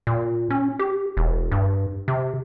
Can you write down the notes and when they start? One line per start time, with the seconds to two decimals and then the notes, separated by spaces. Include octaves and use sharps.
0.07 A#2
0.51 C#4
0.79 G4
1.17 E1
1.52 G2
2.08 C3